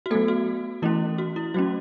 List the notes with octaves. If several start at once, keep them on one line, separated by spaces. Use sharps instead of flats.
F#4
F#3 A3 B3 A4
F#4
E3 A3 C#4 E4
F#4
E4
F#3 A3 C#4 F#4